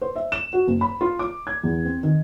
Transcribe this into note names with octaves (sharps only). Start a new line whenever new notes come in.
C5
E5
E7
F#4
F#1
B5
F4
D6
G#6
E2
C4
D#3